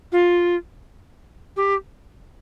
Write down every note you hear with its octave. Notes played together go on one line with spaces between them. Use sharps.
F4
G4